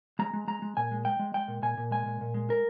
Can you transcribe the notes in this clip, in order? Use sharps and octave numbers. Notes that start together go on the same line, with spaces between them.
G#3 A#5
G#3
G#3 A#5
G#3
A#2 G#5
G#3
G#3 G5
G#3
G#3 G5
A#2
A#2 G#5
A#2
G#3 G#5
A#2
A#2
G#3
A#4